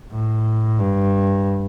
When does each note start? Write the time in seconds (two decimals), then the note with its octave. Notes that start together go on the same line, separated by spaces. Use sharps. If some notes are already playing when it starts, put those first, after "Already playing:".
0.12 A2
0.79 G2